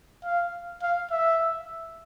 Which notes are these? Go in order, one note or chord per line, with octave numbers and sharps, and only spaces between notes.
F5
F5
E5